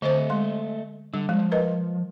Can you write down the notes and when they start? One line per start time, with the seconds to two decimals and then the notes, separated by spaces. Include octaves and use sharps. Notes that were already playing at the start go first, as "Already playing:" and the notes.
0.02 D3 A3 C5 D#5
0.30 G#3 C6
1.14 D3 G3
1.29 F3 G#3
1.52 A#4 B4 D#5